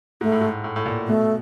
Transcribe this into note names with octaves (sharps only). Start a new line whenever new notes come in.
G#2 A3
A2
G#2
A2
A2
A#2
B2 A3